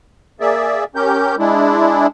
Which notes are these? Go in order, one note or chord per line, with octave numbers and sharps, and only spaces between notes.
A#3 G#4 D5 E5
C#4 G4 A#4 G6
G#3 D4 E4